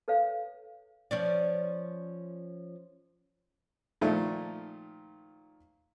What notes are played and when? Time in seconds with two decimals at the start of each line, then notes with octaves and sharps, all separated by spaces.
0.08 A4 B4 C#5 F5
1.11 F3 C#4 D5
4.01 A#2 D#3 F3 A3